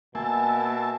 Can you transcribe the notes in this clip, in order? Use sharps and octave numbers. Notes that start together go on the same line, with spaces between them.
B2 A#3 E5 G#5 A5